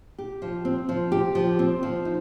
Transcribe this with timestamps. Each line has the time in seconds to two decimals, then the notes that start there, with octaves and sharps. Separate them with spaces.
0.18 G4
0.42 F3
0.65 C4
0.89 F3
1.12 G4
1.35 F3
1.59 C4
1.83 F3
2.05 D#4